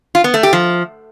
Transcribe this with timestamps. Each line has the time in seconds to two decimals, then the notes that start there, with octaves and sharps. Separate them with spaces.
0.15 F4
0.24 B3
0.34 A3
0.43 G4
0.53 F3